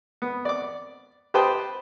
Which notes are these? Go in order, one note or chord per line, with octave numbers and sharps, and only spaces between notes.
B3
D5 D6
G4 B4 C5 G5 A5 D#6